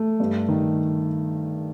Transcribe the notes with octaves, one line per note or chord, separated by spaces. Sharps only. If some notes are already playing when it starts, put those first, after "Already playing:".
Already playing: A3
G2
D#3